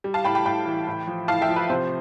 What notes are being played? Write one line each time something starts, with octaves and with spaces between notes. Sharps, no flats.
G3
F5 A5
A2 G5 B5
G5 B5
A2 G5 B5
E3
A2
F3
A2 F5 A5
E5 G5
F3
B4
C3 C5